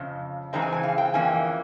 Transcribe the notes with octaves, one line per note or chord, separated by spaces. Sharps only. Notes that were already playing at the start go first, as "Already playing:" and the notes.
Already playing: F2 C#3
C#3 E3 G#3 C4 A#5
G#5
G#5
F5
G5
F2 E3 A#3 C#4 G#5